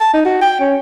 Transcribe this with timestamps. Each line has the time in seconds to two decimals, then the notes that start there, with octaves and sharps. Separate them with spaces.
0.01 A5
0.14 D#4
0.25 F#4
0.42 G5
0.60 C#4